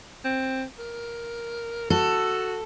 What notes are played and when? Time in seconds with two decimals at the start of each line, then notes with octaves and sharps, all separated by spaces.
0.25 C4
0.79 A#4
1.90 F#4 A4